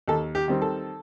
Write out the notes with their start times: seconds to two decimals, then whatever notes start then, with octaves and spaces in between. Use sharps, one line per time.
0.08 D#2 A4
0.35 G4
0.48 D#3 G3 C4
0.62 A4